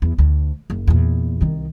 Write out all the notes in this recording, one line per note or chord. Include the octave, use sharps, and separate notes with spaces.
E2
D2
F#1
E2 A#2
C2 D#3